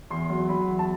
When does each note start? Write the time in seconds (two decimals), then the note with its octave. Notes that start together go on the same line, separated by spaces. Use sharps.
0.11 E2 C6
0.30 F#3
0.49 F#3 B5
0.68 E2
0.79 A5